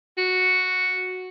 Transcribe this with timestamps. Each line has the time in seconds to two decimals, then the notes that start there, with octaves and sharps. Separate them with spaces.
0.18 F#4